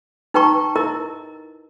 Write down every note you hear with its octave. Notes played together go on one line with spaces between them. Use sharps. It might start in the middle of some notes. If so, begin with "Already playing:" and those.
D#4 B4 G5 A#5 C#6
E4 A#4 D#5 A#5